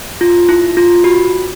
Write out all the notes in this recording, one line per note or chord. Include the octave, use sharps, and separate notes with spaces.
F4
E4
F4
F#4